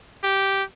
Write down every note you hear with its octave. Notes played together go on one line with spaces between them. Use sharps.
G4